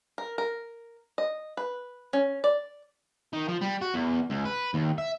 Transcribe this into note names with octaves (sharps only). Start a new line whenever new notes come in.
A#4
A#4
D#5
B4
C#4
D5
D#3
F3
G3
F#4
E2
C#2
B4
D#2
E5